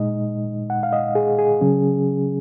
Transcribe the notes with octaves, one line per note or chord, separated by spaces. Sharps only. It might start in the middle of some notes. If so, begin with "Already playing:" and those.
Already playing: A#2 G#3 D#4 D#5
F#5
F5
D#5
G#4
G#4
C#3 F#3 C#4